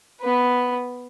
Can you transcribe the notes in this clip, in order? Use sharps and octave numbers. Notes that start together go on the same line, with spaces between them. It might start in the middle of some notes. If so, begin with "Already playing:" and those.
B3 B4